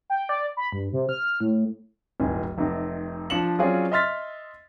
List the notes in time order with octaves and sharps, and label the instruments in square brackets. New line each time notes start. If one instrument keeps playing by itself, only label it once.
[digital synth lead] G5
D5
B5
G2
C3
F6
A2
[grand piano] D1 G1 D#4 G#5
F1 C3 D#4
F3 D4 C#7 E7 F#7
F#3 C4 C#4 F4 G#4 D5
D#5 E5 C6 F6 A6 B6